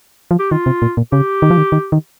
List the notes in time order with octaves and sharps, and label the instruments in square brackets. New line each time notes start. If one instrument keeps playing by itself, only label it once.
[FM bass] F3
[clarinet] G4
[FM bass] D#3 [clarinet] F4
[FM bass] C3
A#2
A#2
[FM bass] C#3 [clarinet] G4
[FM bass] D#3
F3
D#3
D#3
D#3